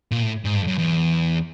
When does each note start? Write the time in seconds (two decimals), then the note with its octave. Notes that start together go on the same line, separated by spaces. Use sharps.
0.11 A#2
0.22 A2
0.45 G#2
0.56 G2
0.62 F2
0.67 F#2
0.78 E2